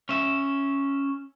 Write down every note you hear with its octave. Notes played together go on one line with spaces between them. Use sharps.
C#4 E5